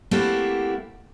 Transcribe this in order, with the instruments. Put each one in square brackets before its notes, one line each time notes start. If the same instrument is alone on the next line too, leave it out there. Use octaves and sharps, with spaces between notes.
[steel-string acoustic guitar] A3 A#3 C4 E4 F#4 G4